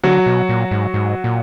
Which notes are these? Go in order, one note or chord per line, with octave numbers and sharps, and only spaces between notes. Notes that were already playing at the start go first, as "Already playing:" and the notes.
D3 F#3 F#4
B2
A#2
G#2
G#2
A#2